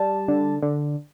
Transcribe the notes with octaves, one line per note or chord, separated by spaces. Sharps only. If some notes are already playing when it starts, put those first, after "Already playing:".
Already playing: G3 A5
D3
D3